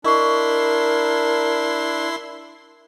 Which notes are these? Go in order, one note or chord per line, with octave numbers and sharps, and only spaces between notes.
D4 E4 A#4 D#5 C6 C#6